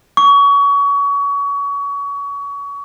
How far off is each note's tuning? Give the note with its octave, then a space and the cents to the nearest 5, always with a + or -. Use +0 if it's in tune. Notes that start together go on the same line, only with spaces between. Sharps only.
C#6 +30